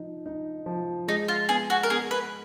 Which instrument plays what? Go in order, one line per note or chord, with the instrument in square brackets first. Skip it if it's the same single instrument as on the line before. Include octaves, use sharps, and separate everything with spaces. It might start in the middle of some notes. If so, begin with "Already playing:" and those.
Already playing: [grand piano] F3 D#4
D#4
F3
[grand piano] G#3 [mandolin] D#4
[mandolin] F4
[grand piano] B3 [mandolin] G#4
[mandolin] F#4
A#4
[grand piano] B3 [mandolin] G#4
[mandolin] B4